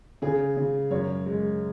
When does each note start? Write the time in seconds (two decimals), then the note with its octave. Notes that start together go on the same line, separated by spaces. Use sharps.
0.22 C#3 G#4
0.57 C#3
0.91 F#2 C#5
1.26 G#3